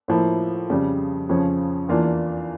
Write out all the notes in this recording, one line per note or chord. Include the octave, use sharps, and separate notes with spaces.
A2 F3 A#3 E4
F2 C#3 G3
F2 C#3 F3 C#4
E2 E3 A#3 D4 F4